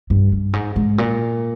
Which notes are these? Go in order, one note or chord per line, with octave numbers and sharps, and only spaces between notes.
G2
G2
G#2
G#2
A#2